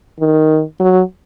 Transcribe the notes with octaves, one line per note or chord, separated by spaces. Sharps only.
D#3
F#3